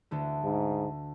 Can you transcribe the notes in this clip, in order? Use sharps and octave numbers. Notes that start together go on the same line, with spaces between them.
D2 D3 A3
G#2